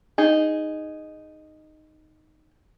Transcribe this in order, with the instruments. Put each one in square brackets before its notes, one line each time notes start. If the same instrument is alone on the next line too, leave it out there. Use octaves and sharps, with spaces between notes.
[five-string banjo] D#4 G#4